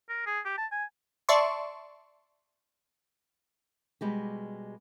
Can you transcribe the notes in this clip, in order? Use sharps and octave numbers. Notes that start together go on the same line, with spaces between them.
A#4
G#4
G4
A5
G#5
D5 E5 A5 C6 C#6
B2 G3 G#3 G4